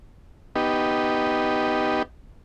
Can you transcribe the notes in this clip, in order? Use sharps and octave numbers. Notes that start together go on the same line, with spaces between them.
B3 D#4 G4